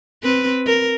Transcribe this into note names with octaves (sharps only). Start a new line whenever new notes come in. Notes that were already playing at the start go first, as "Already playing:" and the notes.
C4 B4
A#4